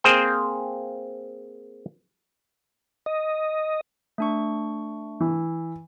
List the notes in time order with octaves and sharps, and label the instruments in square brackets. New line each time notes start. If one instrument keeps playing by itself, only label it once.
[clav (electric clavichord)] A#3 C4 G#4 C5 G5
[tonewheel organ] D#5
[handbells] A3 D4 C#6
[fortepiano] E3